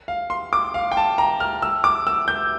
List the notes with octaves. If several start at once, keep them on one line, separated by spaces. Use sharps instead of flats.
F5
C6
D6
F5
G5
A5
A#5
F6
E6
D6
E6
G6